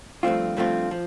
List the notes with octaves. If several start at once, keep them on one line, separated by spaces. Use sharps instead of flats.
G2 F3 A3 C4 F4
G2 F3 A3 C4 F4
F3